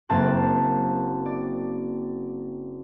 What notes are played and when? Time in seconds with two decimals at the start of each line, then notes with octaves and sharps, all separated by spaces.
0.09 F#1 A#3 C4 A5 C6 F#6
1.26 D5